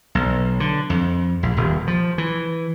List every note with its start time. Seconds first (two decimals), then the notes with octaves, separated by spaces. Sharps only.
0.15 B1
0.60 D3
0.90 F2
1.43 A#1
1.57 D#1
1.87 F3
2.18 E3